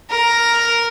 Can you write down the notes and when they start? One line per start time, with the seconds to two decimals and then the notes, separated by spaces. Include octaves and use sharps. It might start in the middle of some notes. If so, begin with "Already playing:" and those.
0.10 A#4